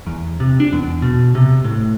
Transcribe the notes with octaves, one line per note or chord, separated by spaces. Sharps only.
E2
C3
D4
E2
B2
C3
A2